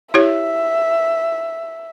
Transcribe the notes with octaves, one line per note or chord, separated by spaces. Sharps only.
E4 G4 C#5 E5